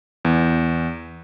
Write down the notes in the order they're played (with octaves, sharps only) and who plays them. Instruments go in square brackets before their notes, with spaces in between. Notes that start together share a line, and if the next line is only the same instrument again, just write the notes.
[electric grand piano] E2